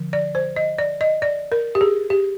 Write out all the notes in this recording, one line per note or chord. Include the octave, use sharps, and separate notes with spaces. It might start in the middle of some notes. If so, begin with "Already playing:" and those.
Already playing: D3 F3
D5
C5
D#5
D5
D#5
D5
A#4
G4
G#4
G4